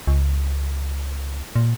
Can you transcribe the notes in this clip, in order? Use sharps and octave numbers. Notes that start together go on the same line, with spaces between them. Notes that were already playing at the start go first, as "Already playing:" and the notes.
C#2
A#2